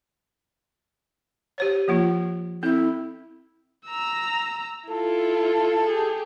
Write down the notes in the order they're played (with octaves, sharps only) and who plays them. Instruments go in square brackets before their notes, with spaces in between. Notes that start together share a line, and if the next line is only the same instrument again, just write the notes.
[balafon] G4 C5 C#5
F3 A#3 F4
[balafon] C4 A4 [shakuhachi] E4
[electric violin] A#5 E6
[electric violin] E4 F4 [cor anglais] A4
[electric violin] G4 G#4